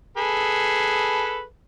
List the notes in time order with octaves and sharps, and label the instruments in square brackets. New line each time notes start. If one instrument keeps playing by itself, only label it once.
[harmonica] G#4 A4 B4